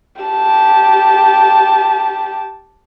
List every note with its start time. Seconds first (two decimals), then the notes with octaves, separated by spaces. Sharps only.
0.21 G4 A5